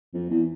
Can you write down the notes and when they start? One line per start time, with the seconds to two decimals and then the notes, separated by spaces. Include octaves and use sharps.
0.14 F2
0.30 E2